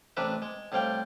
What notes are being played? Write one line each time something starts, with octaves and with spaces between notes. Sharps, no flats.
A1 C3 D4 A#4 B4 E5
G#3
A2 C3 G3 F5 G5